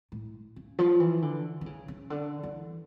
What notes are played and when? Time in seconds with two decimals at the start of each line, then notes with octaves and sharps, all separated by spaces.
0.12 A2
0.56 C#3
0.79 F3
1.00 E3
1.22 D3
1.61 D3
1.66 C#3
1.88 C#3
2.10 D3
2.43 E3